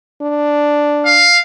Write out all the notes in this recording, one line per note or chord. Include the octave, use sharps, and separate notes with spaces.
D4
F5